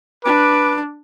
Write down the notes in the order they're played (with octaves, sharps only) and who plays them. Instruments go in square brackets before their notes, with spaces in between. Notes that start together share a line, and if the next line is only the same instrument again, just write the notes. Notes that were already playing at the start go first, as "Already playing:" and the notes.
[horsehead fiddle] D4 [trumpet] B4 [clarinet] D6